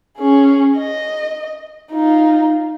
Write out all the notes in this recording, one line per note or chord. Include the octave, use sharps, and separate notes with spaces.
C#4 G#4
D#5
D#4 F4